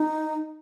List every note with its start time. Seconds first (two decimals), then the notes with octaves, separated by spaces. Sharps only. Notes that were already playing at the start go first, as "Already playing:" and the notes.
Already playing: D#4